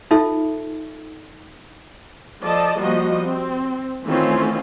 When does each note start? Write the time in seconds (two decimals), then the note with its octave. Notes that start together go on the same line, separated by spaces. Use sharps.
0.11 D#4 F4 A4 E5
2.43 F3 A4 D5 D#5 A5
2.78 F3 G3 A#3 F#4 D#5
3.22 C4
4.05 D#3 E3 A3 C4 C#4 F4